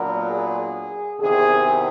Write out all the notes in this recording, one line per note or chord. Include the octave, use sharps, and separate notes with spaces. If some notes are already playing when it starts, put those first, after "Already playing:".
Already playing: A#2 F#3 B3 D4 A#4
G#4
E2 C3 D#3 G#4